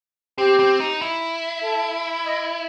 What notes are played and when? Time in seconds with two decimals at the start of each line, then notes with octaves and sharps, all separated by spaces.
0.38 C4 G4
0.59 C4
0.80 D#4
1.02 E4
1.63 A4
2.26 D#5